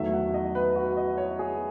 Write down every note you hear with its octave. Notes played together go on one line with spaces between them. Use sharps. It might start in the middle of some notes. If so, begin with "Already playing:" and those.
Already playing: E2 D#3 F#3 A3 E5
F#5
D#5
B4
F#4
D#5
C#5
G#4